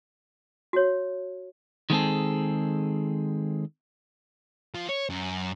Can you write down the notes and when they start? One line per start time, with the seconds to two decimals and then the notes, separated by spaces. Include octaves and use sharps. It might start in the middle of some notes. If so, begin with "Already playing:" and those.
0.73 F#4 C#5
1.90 D#3 G#3 B3 C4 G#4 A4
4.74 F3
4.89 C#5
5.10 F#2